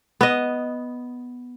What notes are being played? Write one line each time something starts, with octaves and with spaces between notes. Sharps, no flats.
B3 D#5